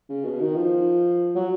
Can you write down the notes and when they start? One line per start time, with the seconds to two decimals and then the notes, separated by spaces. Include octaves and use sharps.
0.09 C#3
0.24 B2
0.41 D#3
0.56 F3
1.35 F#3